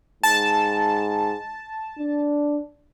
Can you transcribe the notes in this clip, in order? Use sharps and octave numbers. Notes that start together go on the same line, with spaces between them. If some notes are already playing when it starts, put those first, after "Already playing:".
G#2 A5
D4